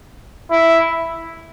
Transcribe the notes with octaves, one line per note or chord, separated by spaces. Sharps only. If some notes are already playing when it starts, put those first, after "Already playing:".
E4